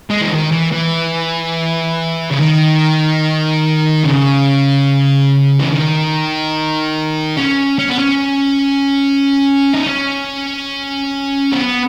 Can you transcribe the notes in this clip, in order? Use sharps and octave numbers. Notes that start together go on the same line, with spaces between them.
G#3
E3
D#3
E3
E3
C#3
D#3
C#3
E3
D#3
C#4
C#4
B3
C#4
D#4
C#4
B3